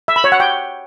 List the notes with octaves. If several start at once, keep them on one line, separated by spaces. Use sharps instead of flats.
E5
B5
C#5
F#5
G5